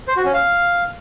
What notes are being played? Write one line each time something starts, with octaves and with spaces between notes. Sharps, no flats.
C5
F#4
C#4
F5